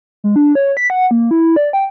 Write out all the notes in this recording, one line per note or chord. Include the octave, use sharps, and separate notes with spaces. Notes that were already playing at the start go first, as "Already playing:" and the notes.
G#3
D4
C#5
B6
F#5
A#3
E4
D5
G5